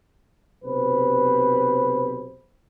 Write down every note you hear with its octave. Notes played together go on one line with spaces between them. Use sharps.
B1 C3 B4 C5